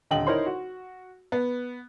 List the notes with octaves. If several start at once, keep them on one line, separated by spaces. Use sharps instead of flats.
D#1 D3 D#5 G5 F#7
D#4 E4 A#4 C5 C#5 C6
F#4
B3